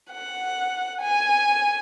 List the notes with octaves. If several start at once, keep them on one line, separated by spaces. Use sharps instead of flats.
F#5
G#5